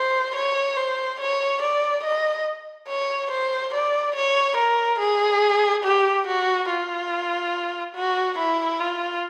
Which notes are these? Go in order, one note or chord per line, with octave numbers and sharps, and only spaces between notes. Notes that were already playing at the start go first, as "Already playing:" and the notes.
Already playing: C5
C#5
C5
C#5
D5
D#5
C#5
C5
D5
C#5
A#4
G#4
G4
F#4
F4
F#4
E4
F4